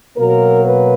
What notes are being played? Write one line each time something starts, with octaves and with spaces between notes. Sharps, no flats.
B2 F#3 A#3 A#4
B4